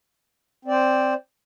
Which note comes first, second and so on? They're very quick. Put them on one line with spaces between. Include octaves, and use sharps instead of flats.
C4 D5 C5